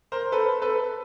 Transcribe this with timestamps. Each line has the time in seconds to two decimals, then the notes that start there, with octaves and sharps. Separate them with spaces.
0.12 A#4 C5
0.32 A4 B4
0.62 A4 B4